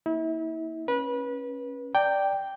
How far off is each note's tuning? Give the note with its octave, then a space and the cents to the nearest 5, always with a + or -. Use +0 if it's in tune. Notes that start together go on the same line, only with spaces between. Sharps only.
A#3 +0 E4 -35
C#4 -15 B4 -25
D5 +0 G5 +0 A#5 -40